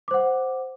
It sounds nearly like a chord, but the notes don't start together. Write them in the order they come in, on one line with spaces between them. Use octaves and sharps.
D6 C5 F#5